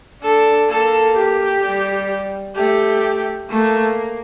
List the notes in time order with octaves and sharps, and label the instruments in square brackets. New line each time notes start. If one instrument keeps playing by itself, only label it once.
[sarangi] D4 [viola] A4
[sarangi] A#3 [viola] A4
[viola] G4
[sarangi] G3
[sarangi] A3 [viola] G4
[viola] A3 [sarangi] A#3